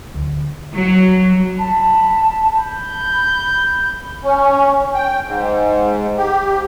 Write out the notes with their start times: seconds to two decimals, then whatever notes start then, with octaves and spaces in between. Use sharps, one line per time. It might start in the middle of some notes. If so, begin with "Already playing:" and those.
0.14 D2
0.75 F#3
1.59 A5 B5
2.57 B5 G6
4.23 C#4
4.94 G5
5.25 G#2
6.17 G4